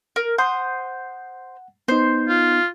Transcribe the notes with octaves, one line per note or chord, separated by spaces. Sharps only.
A#4
C5 F#5 C6 D#6
B3 D#4 C5
F4